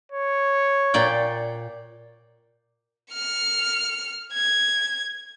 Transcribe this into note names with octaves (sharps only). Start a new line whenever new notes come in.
C#5
A#2 D5 G5
F6 C#7
G#6